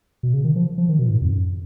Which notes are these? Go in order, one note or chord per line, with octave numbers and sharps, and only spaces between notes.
B2
C#3
D#3
F3
F3
D#3
B2
A#2
G#2
F2
F#2